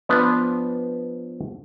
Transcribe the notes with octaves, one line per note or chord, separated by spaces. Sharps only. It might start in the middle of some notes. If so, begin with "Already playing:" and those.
F3 B3 D4 B4